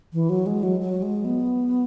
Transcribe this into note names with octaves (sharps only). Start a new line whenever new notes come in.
E3
F#3
G#3
F#3
F#3
G#3
B3